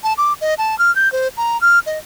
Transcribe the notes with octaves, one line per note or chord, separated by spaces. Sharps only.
A5
D6
D#5
A5
F6
G6
C5
A#5
F6
D#5